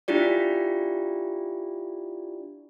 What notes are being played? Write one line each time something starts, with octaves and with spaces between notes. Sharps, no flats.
D4 E4 F4 G4 D5